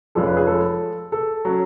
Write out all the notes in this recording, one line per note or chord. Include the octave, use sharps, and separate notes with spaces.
F1 F2 F3 G#3 C#4 A4
B4
G#4
A4
A4
F#3 C#4